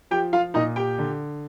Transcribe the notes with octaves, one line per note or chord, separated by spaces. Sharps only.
F3 G4 G5
F4 F5
A#2 D#4 D#5
G4 G5
D3